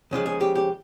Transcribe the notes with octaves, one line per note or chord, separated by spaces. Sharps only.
D#2 C#3 F3 G#3
G#4
G4
G4